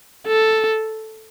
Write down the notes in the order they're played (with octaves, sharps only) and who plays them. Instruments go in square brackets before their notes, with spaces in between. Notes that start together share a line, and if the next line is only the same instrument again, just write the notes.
[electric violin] A4